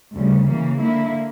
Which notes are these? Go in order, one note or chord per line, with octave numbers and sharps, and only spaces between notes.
D2 C#3 G3
C#3 E3 A#3
D3 A#3 E4